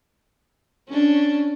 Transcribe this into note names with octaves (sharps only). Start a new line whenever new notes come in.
C#4 D4